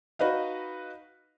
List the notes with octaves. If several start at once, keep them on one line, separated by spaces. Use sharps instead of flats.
D#4 F#4 B4 D#5 F5